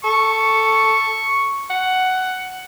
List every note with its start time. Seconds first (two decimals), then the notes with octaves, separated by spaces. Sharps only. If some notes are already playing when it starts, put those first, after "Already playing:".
0.04 A4 C#6
1.70 F#5